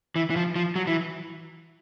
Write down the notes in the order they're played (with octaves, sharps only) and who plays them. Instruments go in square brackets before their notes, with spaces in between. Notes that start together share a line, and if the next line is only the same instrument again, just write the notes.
[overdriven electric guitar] E3
E3
F3
F3
F#3
E3